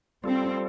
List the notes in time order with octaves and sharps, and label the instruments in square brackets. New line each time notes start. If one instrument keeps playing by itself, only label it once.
[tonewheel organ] G3 F4 A4 [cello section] C4